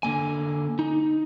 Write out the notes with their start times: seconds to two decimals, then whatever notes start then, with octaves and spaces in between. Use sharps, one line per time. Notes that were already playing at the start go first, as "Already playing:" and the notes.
0.03 D3 A#3 G#5
0.79 D#4